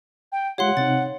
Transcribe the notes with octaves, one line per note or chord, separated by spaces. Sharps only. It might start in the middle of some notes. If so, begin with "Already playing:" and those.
G5
G#3 F4 G4 C#5 F5 F#5 C6
C3 C4 D#4 C#5 A6